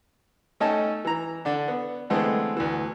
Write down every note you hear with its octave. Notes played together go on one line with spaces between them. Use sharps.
A3 C#4 D#4 D#5 G5 A5
E3 A#5
D3 D4
B3
D3 E3 G#3 A3 B3 C4
D2 E3